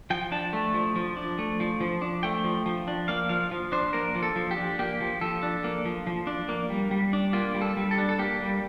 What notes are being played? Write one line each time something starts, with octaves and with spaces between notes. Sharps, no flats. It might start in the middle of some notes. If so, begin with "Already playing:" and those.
F3 G5
D4 A5
A3
F3
F3
D4
A3
F3
F3
D4
A3 G5
F3
F3
D4
A#3 F5
F3 F5
F3
D4 C5
A#3 A#4
F3
A4
F3
G4
D4
A#3 G4
F3
F3 A4
D4
A#3
F3
F3
D4
A#3
G3
G3
D4
A#3 F4
G3
A4
G3
A4
D4
A4
A#3 G4
G3